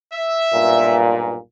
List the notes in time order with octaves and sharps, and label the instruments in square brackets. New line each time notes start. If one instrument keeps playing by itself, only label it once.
[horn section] E5
[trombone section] B1 G2 A#2